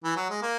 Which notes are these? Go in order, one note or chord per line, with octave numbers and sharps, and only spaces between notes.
E3
F#3
G#3
A#3